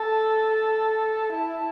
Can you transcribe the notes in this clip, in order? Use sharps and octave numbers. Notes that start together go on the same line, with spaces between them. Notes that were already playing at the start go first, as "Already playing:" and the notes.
Already playing: A4 A5
E4